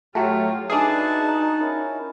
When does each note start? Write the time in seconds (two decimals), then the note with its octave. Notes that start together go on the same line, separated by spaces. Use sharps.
0.15 A2 F#3 A3 F4 G4
0.70 D4 D#4 F#4 G#4 B4 E5 A5
1.60 C#4 E4 A#4